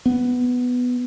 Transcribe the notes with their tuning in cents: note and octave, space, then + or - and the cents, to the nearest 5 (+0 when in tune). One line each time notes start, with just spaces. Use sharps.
B3 +5